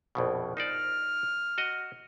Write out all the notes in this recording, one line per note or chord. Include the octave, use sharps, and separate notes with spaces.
A#1 F2 B2
D#4 C5 D5 F6
F#4 D#5